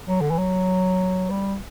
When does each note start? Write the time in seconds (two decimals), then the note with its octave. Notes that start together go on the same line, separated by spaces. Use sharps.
0.08 F#3
0.21 D3
0.31 E3
0.38 F#3
1.30 G3